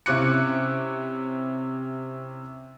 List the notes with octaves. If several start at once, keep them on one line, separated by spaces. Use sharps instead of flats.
C3 C#4 E4 D6 F#6 C#7